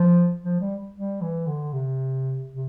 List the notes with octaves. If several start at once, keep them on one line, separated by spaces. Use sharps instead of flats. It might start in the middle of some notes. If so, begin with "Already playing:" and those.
Already playing: F3
F3
G3
G3
E3
D3
C3
C3